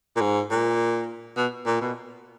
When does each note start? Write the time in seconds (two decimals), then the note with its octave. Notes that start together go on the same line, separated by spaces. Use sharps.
0.16 A#2
0.21 G#2
0.51 A#2
1.37 B2
1.66 A#2
1.81 B2